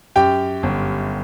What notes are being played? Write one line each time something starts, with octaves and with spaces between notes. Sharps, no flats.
F#2 G4 G5
G1